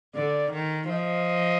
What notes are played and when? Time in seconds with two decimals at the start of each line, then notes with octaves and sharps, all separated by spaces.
0.15 D3 D5
0.52 D#3
0.89 F3 D#5